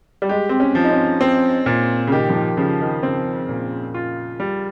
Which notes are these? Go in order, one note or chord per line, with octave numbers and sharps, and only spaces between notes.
G3
G#3 G4
C4
C#4
F3
D#4
C#4
C4
A#2
C#3
D#3 G4
F3
D#3
C#3 F3
D#3
C#3 C4
A#2
F4
G3